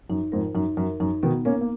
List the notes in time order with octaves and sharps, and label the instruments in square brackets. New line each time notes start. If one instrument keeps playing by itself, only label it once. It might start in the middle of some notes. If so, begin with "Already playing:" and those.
[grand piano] F#2 [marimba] D#4
[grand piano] F2 G#2 [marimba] A#4
[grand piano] F#2 [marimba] D#4
[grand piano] F#2 [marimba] A#4
[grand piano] F#2 [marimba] D#4
[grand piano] B2 D#3 [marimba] B3
[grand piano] A#3 C#4 [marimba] A#4
[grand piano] A#3